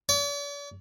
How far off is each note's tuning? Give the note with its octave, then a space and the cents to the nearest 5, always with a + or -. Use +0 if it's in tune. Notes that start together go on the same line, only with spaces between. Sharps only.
D5 -45